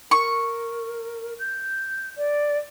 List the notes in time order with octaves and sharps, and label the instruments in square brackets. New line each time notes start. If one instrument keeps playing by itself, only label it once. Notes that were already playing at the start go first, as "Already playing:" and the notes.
[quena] A#4 [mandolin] C#6
[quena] G6
D5